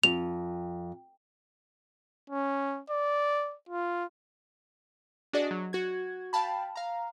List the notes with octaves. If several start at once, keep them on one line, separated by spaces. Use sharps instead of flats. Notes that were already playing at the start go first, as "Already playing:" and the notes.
F2 F7
C#4
D5
F4
D4 F#4 G#4 D5 D#5
F#3
F#4 G#6
F5 G5 A5 B5
F5 A#5